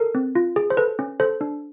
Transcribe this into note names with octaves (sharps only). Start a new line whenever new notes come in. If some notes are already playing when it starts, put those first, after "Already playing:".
Already playing: A4 A#4
C4
F4
G#4
C5
A4 B4
C#4
A4 C5
D4